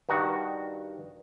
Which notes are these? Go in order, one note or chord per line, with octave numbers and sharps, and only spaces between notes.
G2 D#3 F#4